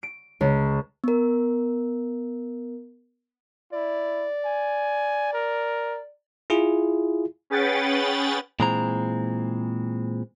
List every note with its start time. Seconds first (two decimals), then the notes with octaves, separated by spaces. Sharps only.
0.03 D7
0.41 C#2
1.04 B3 A#4
3.73 E4 D5
4.45 G#5
5.33 A#4
6.50 E4 F4 G#4
7.50 C#4 G#4 B4 F#5 G5 A6
8.60 A#2 E3 G#3 C4 A#5